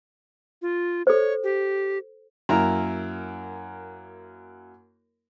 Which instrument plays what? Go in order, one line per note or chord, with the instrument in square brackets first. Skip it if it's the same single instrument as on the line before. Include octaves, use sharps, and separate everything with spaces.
[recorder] F4
[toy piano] A4 C5 [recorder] C#5
[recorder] G4
[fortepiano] F#2 A#3 E4 A#4 A#5